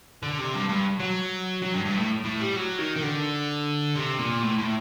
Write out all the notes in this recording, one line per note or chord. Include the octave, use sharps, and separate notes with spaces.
D3
C3
G2
G2
F#3
F#3
G2
G2
A2
A2
G3
F#3
D#3
D#3
D3
C3
A#2
A2
A2